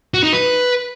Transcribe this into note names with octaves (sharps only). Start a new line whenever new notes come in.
F#4
D#4
B4